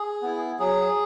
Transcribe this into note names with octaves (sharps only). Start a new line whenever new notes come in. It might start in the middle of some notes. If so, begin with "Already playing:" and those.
Already playing: G#4
B3 E4
F#3 G#4